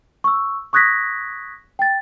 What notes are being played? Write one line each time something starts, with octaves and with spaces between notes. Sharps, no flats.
C#6 E6
C#6 D#6 F#6 G#6 A#6 B6
G5 A6